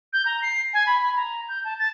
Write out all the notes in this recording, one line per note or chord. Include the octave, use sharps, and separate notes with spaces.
G6
A#5
C7
G#5
B5
A#5
G6
A5
A6